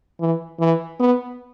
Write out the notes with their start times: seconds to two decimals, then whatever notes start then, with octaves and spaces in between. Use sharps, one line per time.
0.21 E3
0.60 E3
1.00 B3